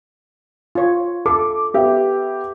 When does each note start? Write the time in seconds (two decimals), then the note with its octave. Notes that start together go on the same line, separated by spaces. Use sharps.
0.75 F4 C#5
1.26 A4 D6
1.74 B3 G4 E5